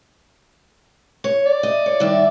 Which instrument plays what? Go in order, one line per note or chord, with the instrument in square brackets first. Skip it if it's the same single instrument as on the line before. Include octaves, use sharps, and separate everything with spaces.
[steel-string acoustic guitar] C#5
[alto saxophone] D5
[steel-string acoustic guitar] D#5
C#5
G2 D#3 E5